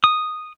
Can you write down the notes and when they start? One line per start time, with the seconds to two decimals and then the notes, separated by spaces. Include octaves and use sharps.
0.04 D#6